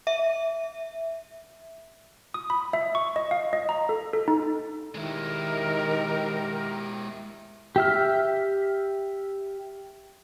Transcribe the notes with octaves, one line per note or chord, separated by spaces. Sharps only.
E5
D#6
B5
E5
C#6
D#5
F5
D#5
A#5
A4
A4
D#4
D#3 G#3 E4 G4 A#4
G4 E5 F6